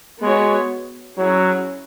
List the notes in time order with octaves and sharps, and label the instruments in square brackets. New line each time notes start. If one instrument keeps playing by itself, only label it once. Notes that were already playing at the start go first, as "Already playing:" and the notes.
[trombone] G#3 [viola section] B3 F#4 C#5
[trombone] F#3 [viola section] C#4 E4 G#4 C#5